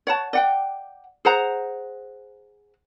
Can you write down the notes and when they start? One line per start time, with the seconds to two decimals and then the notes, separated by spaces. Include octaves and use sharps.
0.07 C#5 F#5 A5
0.33 D5 F#5 G5
1.25 G#4 C5 F#5 A#5